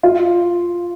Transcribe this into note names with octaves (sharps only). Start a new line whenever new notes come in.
F4